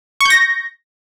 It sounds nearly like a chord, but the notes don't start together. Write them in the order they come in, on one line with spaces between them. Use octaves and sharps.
C#6 G6 A#6